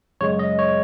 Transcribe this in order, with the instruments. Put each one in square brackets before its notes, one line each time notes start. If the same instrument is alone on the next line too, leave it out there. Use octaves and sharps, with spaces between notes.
[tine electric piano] F#2 C#3 G#3 C#5
D#5
C#5